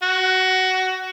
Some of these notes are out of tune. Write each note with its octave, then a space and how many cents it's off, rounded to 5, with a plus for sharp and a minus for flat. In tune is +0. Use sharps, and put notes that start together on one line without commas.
F#4 +15